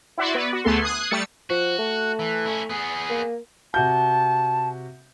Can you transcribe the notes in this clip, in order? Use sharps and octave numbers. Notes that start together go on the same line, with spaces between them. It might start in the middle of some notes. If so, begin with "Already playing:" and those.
E4 F#4 D5 E5 C6
B3 B4 D5
F#4
D2 A3 B3 G#4 A4 C6
D#6 F#6 G#6 C7
G3 A3 E6 A6 C#7
F3 F#4
A3
E3
C#4 E4
B3 G#4
A#3
C3 F#4 A5 G6